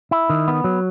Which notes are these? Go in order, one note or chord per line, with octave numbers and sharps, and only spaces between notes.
E4
D#3
B3
F#3